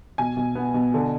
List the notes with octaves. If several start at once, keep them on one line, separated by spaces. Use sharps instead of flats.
B2 G#5
B2
B3
B2
D3